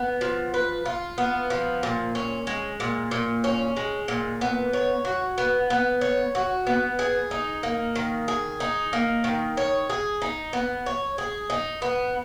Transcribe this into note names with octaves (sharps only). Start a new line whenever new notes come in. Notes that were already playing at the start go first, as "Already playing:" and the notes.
Already playing: B3
F3
B4
F4
B3
F3
A#2
C#4
G#3
A#2
A#2
C#4
G#3
A#2
B3
C#5
F#4
B3
B3
C#5
F#4
B3
G#4
D#4
A#3
D#3
G#4
D#4
A#3
D#3
C#5
G#4
D#4
B3
C#5
G#4
D#4
B3